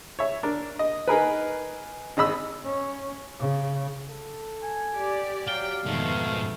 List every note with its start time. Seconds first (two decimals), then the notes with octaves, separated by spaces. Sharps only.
0.19 C#5 E5
0.43 D4 A#4
0.79 D#5
1.08 D#4 G#4 A#4 B4
2.17 G#1 D#5 B5 E6
2.65 C#4
3.39 C#3
4.09 A4
4.63 G#5
4.95 G4 D5
5.48 F#3 F5 G5
5.86 F2 G#2 B2 D#3 A3